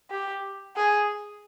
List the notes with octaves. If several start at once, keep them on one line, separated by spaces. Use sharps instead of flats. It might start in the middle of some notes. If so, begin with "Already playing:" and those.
G4
G#4